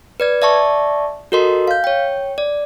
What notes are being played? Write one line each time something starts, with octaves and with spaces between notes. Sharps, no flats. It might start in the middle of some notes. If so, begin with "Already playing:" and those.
B4 D5 G#6
D5 E5 A5 C#6
F#4 A4 A#4 D#5 C6
F5 G6
C#5 G5
D5